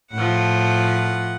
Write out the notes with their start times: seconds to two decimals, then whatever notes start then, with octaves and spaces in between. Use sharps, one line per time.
0.12 A2 F3 F#5